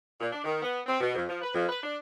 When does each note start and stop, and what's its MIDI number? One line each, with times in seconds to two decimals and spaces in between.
0.21 0.28 46
0.32 0.43 62
0.44 0.59 51
0.63 0.81 59
0.87 0.99 60
1.00 1.14 47
1.15 1.24 41
1.28 1.41 53
1.42 1.51 71
1.54 1.65 41
1.69 1.80 71
1.83 1.97 62